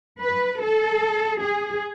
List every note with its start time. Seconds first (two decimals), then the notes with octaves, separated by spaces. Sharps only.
0.22 B4
0.63 A4
1.41 G#4